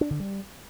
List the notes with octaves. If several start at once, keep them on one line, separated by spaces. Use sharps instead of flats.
D4
D3
G3